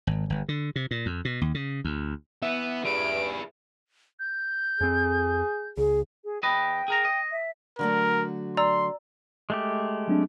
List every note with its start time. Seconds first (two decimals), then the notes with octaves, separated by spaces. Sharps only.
0.07 G#1
0.30 G1
0.49 D3
0.76 C3
0.91 A#2
1.06 F2
1.25 B2
1.41 D#2
1.55 C#3
1.85 D2
2.43 E3 B3 E5
2.85 G2 G#4 B4 D7
4.20 G6
4.81 F2 C4 G#4
5.77 C#2 G#4
6.24 G#4
6.43 E2 B4 D#5 G5
6.88 G#4 A#4 A#5
7.05 D#5
7.32 E5
7.79 D3 F#3 A3 A#4
8.57 D5 A#5 C6 E6
9.50 G#3 A3 G4
10.08 F#3 C4 D4